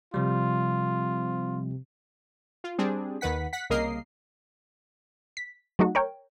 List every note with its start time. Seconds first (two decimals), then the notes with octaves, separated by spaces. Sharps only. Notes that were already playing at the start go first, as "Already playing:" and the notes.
0.14 C3 F3 G3 F4
2.64 F4
2.78 G3 C4 D4 G#4
3.21 D#2 D#3 B4 F#5 B6
3.53 F#5 B6
3.70 C2 C#3 A#3 A#4 D#5 C7
5.37 B6
5.79 F#3 A3 D#4 F#4
5.95 A#4 C#5 G5